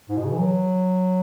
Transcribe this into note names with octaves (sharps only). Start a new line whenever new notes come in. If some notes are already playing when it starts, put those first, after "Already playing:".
G#2
B2
C#3
E3
F#3